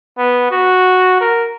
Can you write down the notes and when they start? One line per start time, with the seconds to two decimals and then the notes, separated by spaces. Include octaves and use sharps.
0.18 B3
0.51 F#4
1.21 A#4